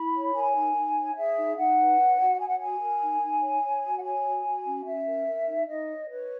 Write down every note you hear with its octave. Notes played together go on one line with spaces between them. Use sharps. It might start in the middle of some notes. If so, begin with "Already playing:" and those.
Already playing: E4 B5
C#5
A#4 G#5
D#4
D#4
C#5
G#4 E5
D#4
D#4 F#5
B4
C#5
F#4
C#5 G#5
F#5
F#4 G#5
A#4
D#4
D#4
C#5
C#5
F#4
F#5
C#5 G#5
F#4
F#4
C#4
C#4 E5
A#4
A#4
D#4
D#4 D#5
C#5
B4 C#5